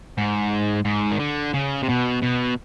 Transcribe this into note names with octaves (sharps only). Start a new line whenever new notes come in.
G#2
G#2
D#3
D3
C#3
C3
B2
B2